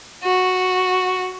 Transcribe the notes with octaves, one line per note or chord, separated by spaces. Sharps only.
F#4